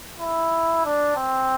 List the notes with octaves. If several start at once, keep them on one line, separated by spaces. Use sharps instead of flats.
E4
D4
C4